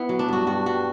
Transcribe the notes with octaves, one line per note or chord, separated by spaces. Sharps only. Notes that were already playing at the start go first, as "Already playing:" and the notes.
Already playing: B3 E4
F#3
D4
G2 F#4
G2 F#4
G3 F#4